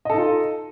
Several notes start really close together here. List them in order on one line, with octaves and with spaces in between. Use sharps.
D#5 A4 D#4 F4